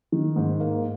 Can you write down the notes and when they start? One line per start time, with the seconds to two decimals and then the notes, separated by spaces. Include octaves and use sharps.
0.12 D#3
0.36 G#2
0.60 A#3